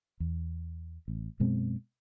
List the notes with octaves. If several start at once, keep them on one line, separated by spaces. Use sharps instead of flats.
E2
A1
F#2 B2 G#3 C4